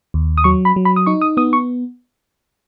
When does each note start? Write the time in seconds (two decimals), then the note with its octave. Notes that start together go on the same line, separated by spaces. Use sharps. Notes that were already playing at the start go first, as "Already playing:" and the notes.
0.14 D#2
0.38 D#6
0.44 F#3 C#6
0.65 B5
0.76 F#3
0.85 B5
0.96 D#6
1.06 D#4 C#6
1.21 D#6
1.37 B3 D#6
1.53 C#6